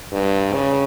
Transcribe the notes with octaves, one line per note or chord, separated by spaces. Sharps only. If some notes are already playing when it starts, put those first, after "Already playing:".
G2
C#3